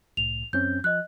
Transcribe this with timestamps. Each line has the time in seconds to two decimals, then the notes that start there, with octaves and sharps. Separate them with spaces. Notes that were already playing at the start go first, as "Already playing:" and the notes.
0.17 C2 A2 F7
0.53 F#2 C4 C#4 G6
0.84 F3 D#5 F#6